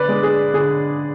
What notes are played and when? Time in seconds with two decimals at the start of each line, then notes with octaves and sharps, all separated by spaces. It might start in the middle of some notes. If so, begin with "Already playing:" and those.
Already playing: D3 B4 D5
0.09 G#3
0.23 G#4
0.53 D3 G#4